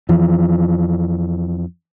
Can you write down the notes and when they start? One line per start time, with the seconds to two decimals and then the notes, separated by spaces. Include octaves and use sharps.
0.09 F2 E3 F3